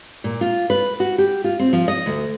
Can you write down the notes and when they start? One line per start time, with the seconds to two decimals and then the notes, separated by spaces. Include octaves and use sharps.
0.24 A#2
0.41 F4
0.70 B4
1.00 F#4
1.18 G4
1.44 F4
1.59 C4
1.73 F3
1.88 D#5
2.06 D2